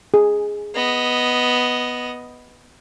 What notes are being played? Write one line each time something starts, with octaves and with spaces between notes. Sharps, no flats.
G#4
B3 D#5